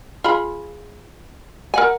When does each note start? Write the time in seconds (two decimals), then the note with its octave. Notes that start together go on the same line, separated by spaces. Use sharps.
0.24 F4 G#4 B5
1.74 A#4 F#5 G#5